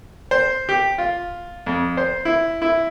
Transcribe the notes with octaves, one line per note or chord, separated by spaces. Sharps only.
C5
G4
F4
F2
C5
E4
E4